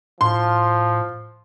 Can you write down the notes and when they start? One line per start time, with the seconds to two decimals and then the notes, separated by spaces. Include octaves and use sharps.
0.21 A2 F3 C6